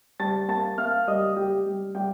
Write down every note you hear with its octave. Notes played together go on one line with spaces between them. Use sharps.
G3 A5 A6
A#3 A5 A6
A#3 F5 F6
G3 D#5 D#6
G3 G4 G5
G3
G3 G4 G5